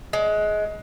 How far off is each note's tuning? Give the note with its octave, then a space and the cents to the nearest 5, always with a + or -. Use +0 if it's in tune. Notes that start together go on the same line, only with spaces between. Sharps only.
G#3 +20